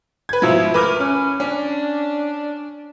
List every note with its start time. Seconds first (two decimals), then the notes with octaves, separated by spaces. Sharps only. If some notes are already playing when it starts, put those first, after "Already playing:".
0.29 B4 G#6
0.42 G#2 B2 F3 E4
0.74 A3 A#4 B4 D6 F6
0.99 C#4
1.40 C#4 D4